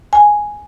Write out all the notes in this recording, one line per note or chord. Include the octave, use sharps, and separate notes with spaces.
G#5